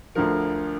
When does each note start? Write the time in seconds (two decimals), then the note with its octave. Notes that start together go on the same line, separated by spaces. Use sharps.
0.15 D2 D3 F3 A#4